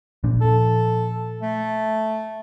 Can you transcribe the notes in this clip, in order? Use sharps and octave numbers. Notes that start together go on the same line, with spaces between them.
A#2 F3 D4
A4
A3